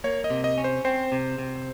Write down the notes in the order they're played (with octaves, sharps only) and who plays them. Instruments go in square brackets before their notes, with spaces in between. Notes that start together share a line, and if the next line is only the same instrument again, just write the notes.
[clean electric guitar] A#3 [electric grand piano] C#5
[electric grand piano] D#5
[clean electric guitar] C3
[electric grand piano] D#5
[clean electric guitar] C#4
[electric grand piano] C5
[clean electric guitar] C4 [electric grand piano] C5
[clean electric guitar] C3
C3